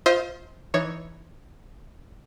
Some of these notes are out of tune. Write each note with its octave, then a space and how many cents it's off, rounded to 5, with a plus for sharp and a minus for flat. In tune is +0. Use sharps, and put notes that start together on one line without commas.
F4 +0 C5 +0 D#5 +45
E3 +0 D#4 +0 C#5 +0